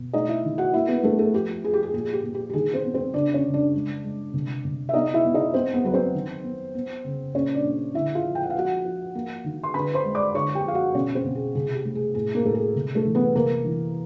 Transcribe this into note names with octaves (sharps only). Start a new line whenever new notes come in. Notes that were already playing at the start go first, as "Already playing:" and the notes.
Already playing: B2
A3 D#4 D#5
E4 E5
D#3
F#4 F#5
A#3 E4 E5
B3 B4
A3 A#3 A4
A3 A4
F3 G4
F3 G#4
G4
G#4
A#2 G#4
G4
A#2
G4
G4
D#3 G#4
C4 C5
B3
C4 C5
C#3 D4 D5
C#4 C#5
C#3
D4 D5
G#3
G#3
C3
C3
E5
B3 D#4 D#5
E4 E5
B3
D#4 D#5
B3 C4 C5
B3 B4
F#3 B4
C4 C5
D#3
B3
B3
C#3
A#2 C#4 C#5
D4 D5
A#2
D3 E4 E5
F4 F5
F3
G5
F#5
F5
F3 F#4 F#5
F3
A#3
D#3
C6
D3 B4 B5
C5 C6
G#3
D5 D6
D3 C#5 C#6
G4 G5
F3 F5
F#4 F#5
B2 C#4 C#5
C4 C5
B2
G#4
C3 G#4
G4
A3
G#4
A2 G#4
A#3 A#4
A2 A4
G#4
C3
A3 A4
E3
B3 B4
C3 A#3 A#4
E3